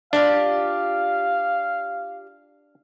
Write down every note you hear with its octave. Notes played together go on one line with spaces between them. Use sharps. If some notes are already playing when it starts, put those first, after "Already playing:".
D4 F4 G4 D5 F5